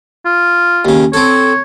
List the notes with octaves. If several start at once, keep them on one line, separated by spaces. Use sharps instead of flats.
F4
D#2 C#3
C4 A4 C#5